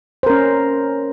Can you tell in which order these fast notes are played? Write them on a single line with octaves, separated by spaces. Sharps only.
C5 A#4 C#4